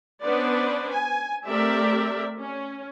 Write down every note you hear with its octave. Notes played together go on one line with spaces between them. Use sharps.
B3 C#4 D4 B4 C5 D5
G#5
A3 C4 G4 A#4 D5 E5
C#4